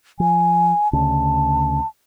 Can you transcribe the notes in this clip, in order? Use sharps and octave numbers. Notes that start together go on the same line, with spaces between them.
F3 G#5
D2 C#3 A5